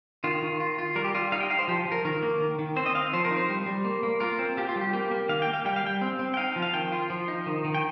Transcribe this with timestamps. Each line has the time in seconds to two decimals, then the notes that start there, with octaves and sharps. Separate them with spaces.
0.24 D#3 F4
0.42 D#3
0.60 F4
0.79 F4
0.95 G3 A#4
1.04 G4
1.14 G3 F4
1.32 D#4 F5
1.41 G5
1.50 D#4 F5
1.59 C5
1.68 F3 G4
1.86 F3
1.92 A#4
2.05 D#3 A#4
2.22 A#3
2.40 D#3
2.59 D#3
2.76 C4 C5
2.86 D#5
2.95 C4 F5
3.13 F3 C5
3.25 A#4
3.31 D#4
3.36 C5
3.49 G3
3.66 G3
3.85 A#3
4.03 A#3
4.20 F4 A#4
4.39 C4
4.57 F4 G4
4.69 F4
4.76 G3
4.81 G4
4.93 A#3 G4
5.11 A#3
5.29 D#3 F5
5.42 G5
5.48 A#3
5.53 F5
5.65 G3 G5
5.76 F5
5.84 G3 G5
6.01 C4
6.19 C4
6.34 G5
6.37 D#4 F5
6.56 F3
6.62 F5
6.74 D#3 G5
6.92 F4
7.10 F3
7.28 D#4
7.46 D#3
7.65 D#3
7.75 G5